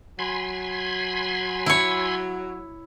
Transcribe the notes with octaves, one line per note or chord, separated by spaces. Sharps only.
F#3 G#5 B5 C6
E4 C#5